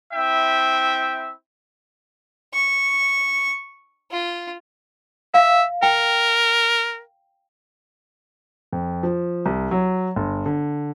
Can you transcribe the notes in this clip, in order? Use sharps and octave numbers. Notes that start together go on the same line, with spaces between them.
C4 E4 E5 G5
C#6
F4
E5 F5
A#4 G5
F2
F3
C2
F#3
G1
D3